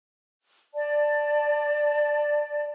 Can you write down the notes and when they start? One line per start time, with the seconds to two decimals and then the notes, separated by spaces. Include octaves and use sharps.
0.73 D5 A5